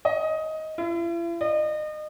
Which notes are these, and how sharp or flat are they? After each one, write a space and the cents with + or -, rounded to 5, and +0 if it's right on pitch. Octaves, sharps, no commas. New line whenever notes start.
D#5 +15
E4 +45
D#5 -35